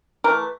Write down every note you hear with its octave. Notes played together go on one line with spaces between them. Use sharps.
E3 A3 A#4